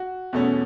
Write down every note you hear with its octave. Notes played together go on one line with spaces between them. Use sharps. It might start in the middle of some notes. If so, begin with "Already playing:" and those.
Already playing: F#4
E2 B2 A3 C#4